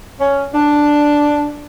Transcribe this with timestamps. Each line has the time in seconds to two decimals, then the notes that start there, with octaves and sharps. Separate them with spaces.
0.20 C#4
0.54 D4